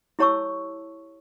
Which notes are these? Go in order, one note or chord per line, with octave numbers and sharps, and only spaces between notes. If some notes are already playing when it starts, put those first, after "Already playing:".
E4 G4 C#5 A5 C#6 E6